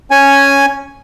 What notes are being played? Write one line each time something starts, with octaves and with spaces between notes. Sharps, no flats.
C#4 G#5